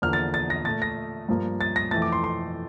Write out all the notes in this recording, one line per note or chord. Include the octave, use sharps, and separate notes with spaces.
E2 D3 F3 A#3 F6
A6
A6
A#6
A#2 A3 A6
A#6
G2 F3 A#3
A6
A#6
F2 E3 A3 A6
D6
C6
C6